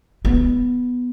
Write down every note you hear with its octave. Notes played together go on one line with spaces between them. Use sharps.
B3